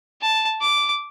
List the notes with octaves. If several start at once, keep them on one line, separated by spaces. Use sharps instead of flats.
A5
D6